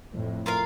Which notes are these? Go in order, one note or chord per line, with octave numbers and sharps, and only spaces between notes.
F2 A2
F4 A#4 F5